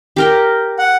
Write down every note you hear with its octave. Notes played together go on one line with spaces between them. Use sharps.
G4 A#4 G5
F#5